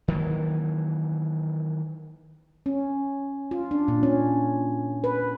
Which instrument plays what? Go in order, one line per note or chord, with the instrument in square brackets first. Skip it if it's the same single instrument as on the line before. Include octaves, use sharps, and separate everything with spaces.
[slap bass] D#3 E3 F#3 A#3
[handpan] C#4
F4
D4
A#2
C#4
B4